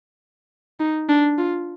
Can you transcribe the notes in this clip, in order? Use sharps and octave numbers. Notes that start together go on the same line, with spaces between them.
D#4
D4
F4